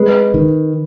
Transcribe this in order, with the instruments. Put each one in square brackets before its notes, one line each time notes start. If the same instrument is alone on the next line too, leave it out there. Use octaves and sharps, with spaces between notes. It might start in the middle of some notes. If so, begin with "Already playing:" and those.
Already playing: [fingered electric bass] G#3 [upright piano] B4
[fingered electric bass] D#3